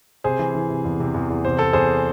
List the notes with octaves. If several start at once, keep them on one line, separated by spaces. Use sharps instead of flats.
C3 G#4 C5
E3
E3
C3
E2
C3
E2
E2
C3 C5
E2 A4
E2 G#4 C5